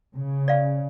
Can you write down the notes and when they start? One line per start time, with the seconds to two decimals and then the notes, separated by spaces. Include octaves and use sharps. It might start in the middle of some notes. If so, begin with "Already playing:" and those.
0.15 C#3
0.48 D5 F5